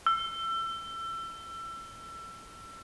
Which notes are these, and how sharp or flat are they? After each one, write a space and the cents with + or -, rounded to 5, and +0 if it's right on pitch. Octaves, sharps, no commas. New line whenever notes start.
E6 +30